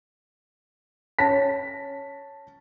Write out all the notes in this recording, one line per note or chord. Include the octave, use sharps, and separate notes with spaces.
C#4 A5 A#6 B6